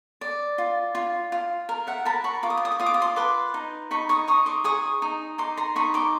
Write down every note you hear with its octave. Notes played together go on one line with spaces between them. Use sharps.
D5
F4
F4
F4
A#4
E5 F#5
A#4 A5 B5
B5 C#6
F4 D6
D#6
D6
D#6
D6
F4 D#6
D6
D#6
C6 D6
B4 C6 D6
D#4
D#4 B5 C#6
C#6 D#6
D#4 C#6 D#6
C6 D6
G#4 C#6 D#6
D#4
D#4 C6 D6
A#5 C6
D#4 B5 C#6
C6 D6